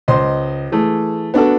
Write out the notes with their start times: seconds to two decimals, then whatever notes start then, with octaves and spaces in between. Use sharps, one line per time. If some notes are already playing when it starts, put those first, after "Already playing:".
0.08 C#2 C5 D#5 C6
0.72 E3 A3 G#4
1.34 B3 D4 F#4 A4